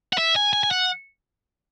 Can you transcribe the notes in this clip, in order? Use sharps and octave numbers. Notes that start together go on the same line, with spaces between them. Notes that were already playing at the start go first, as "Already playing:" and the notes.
F#5
E5
G#5
G#5
G#5
F#5